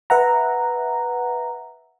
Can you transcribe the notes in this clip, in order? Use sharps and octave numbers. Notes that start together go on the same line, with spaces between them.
B4 E5 F#5 A#5